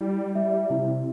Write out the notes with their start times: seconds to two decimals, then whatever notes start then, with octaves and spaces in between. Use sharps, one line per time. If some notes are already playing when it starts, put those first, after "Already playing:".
0.01 G3 E4
0.35 G3 E5
0.70 C3 E4